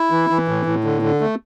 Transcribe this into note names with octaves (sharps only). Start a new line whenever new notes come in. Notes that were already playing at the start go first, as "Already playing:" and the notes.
Already playing: E4
E3
E3
A2
A2
D3
D3
A3